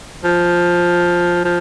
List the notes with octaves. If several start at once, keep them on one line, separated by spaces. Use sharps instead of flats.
F3
F3